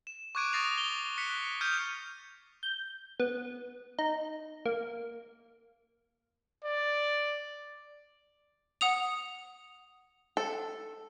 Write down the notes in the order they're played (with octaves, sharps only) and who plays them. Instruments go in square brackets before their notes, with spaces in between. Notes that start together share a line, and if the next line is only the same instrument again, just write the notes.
[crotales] E7
C#6 D6 F#6 G#6 D7 D#7
C#6 D#6 A6 A#6 C7 F7
D#6 G7
F#6 B6 C#7
D#6 F6 G6 G#6 C#7 D#7
[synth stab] G6
B3
D#4
A#3
[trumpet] D5
[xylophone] F#5 D#6 F7
[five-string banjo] A4